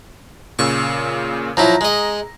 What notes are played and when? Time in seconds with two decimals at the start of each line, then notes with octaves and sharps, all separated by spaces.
0.59 A#2 C#3 C#6 E6
1.57 F3 F#3 E4 A#5 A#6
1.81 G#3 D#5